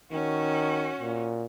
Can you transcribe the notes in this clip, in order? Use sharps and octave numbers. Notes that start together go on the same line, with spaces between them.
D#3 C#4 F#4
A#2